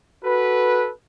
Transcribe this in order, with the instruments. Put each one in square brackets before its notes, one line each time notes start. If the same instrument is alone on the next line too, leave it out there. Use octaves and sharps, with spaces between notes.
[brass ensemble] F#4 A4 B4